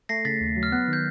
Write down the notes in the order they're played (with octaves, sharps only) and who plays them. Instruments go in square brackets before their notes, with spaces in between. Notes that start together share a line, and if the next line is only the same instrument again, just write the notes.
[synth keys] A3 [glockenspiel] A#6 C7
[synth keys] C#3 [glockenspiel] A6 B6
[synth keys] D#2
F#3
[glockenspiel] F6
[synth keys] B3 [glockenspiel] F#6
[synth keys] D#3
[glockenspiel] G6